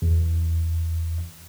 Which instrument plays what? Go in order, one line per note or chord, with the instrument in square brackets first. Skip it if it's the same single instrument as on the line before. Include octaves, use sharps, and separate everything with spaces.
[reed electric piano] E2